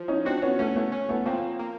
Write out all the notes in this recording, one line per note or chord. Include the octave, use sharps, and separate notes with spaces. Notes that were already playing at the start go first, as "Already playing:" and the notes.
Already playing: F3
C#4 D#4
C4 D4 F#4
B3 C#4
A3 B3 C#4
A3 B3
C#4
A3 B3
F3 A#3 C4
A#3